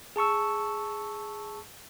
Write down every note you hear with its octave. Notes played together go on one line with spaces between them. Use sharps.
G#4 A5 C#6 E6